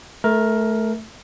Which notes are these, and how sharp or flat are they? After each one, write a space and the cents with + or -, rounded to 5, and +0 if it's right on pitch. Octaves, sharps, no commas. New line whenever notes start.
A3 -15 A#4 +10